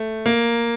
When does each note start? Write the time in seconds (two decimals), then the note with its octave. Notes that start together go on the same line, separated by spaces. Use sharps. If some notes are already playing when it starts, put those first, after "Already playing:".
Already playing: A3
0.26 A#3